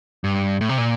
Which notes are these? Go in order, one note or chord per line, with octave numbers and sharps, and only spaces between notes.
G2
A2
C3
A#2